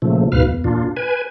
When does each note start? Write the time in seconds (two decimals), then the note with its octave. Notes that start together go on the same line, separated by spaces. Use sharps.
0.02 A#2 C#3 F3 A3
0.32 D2 G#2 B2 B4 F5 F6
0.48 E2
0.64 A#2 D4 F4
0.97 B4 G#5